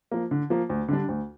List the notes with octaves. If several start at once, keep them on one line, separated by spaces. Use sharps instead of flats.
F3 A#3
D3
F3 A#3
D2
D3 G3 D4
D2